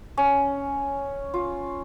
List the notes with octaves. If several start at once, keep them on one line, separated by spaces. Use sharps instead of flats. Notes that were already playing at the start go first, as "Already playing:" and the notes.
C#4
F4